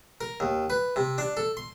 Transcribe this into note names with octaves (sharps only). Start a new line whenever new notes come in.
A#4
D#2
B4
C3
D4
A4
C6